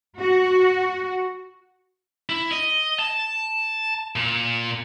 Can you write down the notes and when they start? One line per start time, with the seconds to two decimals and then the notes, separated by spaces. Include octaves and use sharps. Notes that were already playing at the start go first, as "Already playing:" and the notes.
0.18 F#4
2.29 E4
2.51 D#5
2.99 A5
4.16 A#2